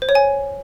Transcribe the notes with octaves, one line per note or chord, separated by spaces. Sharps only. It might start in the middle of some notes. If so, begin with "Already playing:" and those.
C5
C#5
G#5